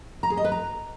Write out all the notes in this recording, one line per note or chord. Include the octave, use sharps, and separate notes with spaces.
A#5
G#4
D#5
B4
A#5